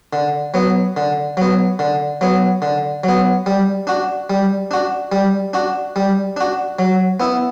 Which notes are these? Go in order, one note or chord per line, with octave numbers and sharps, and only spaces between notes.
D3
F#3 B3
D3
F#3 B3
D3
F#3 B3
D3
F#3 B3
G3
D4 F#4
G3
D4 F#4
G3
D4 F#4
G3
D4 F#4
F#3
B3 E4